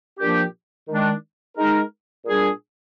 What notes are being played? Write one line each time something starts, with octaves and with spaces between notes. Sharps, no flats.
A#2 F3 A#3 D4 G4
D#3 G#3 D4
G#3 D#4 A#4
A#2 G3 D4 G#4